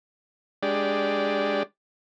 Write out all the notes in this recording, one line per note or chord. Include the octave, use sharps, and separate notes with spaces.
G#3 D4 G4 D5